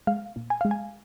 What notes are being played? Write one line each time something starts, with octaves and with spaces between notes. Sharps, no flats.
G#3 F5
A#2
G#5
G#3 F5
G#5